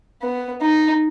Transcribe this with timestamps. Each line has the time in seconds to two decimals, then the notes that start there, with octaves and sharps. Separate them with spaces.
0.22 B3
0.62 D#4